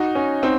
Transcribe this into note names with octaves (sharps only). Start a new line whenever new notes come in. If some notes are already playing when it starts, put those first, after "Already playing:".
Already playing: D#4 F#4
C#4
C4 D#4